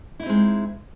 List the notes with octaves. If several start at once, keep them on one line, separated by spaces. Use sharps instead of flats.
G#3 C4 D#4 E4